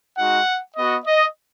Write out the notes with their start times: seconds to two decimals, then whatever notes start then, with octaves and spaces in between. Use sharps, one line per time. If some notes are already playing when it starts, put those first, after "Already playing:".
0.18 G#3 D#4 F#4 F#5
0.76 B3 F#4 D#5
1.05 D#5